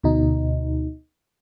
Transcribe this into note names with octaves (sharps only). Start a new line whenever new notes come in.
D2 B2 D#4